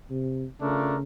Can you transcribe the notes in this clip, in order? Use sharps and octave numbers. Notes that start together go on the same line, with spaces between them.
C3
C#3 A3 D4 F4 A#4